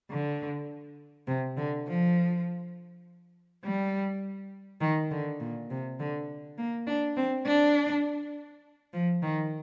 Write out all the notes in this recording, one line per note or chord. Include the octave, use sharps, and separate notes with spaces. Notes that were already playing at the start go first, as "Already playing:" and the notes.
D3
C3
D3
F3
G3
D#3
D3
A#2
C3
D3
A#3
D4
C4
D4
F3
D#3